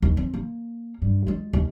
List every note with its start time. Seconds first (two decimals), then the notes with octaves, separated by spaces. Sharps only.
0.02 D#2
0.17 C4
0.34 A#3
1.02 G2
1.27 G#3 F4
1.53 D#2